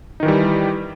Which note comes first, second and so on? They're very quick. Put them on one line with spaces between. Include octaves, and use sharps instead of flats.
D#4 D#3 E3 G3